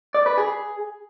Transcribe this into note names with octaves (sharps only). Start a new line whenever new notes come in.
D5
B4
G#4